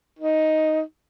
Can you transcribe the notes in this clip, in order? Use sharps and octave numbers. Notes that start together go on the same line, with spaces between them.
D#4